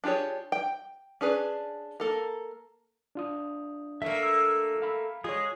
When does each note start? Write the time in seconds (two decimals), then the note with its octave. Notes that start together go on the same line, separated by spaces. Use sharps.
0.04 D4 F4 G4 G#4 C#5
0.52 G5
1.21 C#4 D4 G#4 B4
2.00 A#3 A4 A#4
3.15 D4 F4 D#6
4.02 A3 A#3 E5
4.23 E6
4.82 F5 B5
5.24 G#3 F4 G#4 C#5